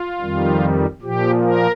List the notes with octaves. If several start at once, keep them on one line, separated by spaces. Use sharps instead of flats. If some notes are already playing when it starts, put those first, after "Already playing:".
Already playing: F4
F2 D#3 G3
A#2 F3 G4
A#4